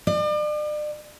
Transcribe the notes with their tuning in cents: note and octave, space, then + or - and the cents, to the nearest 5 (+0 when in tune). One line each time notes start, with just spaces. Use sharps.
D5 +40